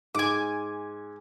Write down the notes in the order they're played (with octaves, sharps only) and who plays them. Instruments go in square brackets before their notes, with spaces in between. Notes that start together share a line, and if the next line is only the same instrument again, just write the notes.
[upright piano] G#2 [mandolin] G#5 D6